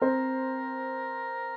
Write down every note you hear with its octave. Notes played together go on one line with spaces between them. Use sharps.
C4 A#4 C5